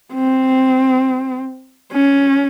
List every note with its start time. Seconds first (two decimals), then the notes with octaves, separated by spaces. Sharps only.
0.14 C4
1.92 C#4